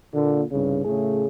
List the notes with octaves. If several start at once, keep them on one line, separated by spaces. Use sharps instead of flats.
A#2 D3
C2 G2 C#3
A2 C#3 A3 G#4